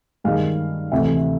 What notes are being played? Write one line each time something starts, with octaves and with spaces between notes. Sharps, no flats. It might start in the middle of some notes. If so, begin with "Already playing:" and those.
G2 D#3 G#3 D#5 F5
D2 C3 E3 A3 E5 F#5